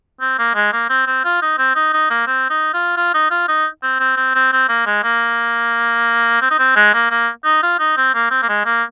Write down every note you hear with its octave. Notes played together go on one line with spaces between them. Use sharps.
C4
A#3
G#3
A#3
C4
C4
F4
D#4
C4
D#4
D#4
A#3
C4
D#4
F4
F4
D#4
F4
D#4
C4
C4
C4
C4
C4
A#3
G#3
A#3
C4
D#4
C4
G#3
A#3
A#3
D#4
F4
D#4
C4
A#3
C4
A#3
G#3
A#3